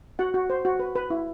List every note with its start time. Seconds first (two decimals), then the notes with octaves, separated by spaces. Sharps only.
0.19 F#4 F#5
0.34 F#4
0.50 C5
0.65 F#4
0.80 B4
0.95 B4
1.10 E4